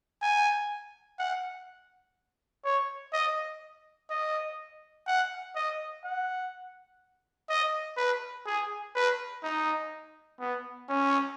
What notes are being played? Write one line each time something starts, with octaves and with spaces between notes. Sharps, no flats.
G#5
F#5
C#5
D#5
D#5
F#5
D#5
F#5
D#5
B4
G#4
B4
D#4
B3
C#4